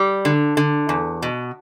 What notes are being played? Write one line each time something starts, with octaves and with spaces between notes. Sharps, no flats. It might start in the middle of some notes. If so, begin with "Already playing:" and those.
Already playing: G3
D3
D3
E2
B2